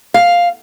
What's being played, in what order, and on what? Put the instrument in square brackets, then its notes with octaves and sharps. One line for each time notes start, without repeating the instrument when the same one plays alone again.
[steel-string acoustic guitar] F5